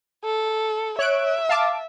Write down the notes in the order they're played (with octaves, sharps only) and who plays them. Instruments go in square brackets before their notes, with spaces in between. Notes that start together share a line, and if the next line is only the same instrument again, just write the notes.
[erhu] A4
[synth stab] C#5 F#6 D7 [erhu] E5
[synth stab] F5 A5 D6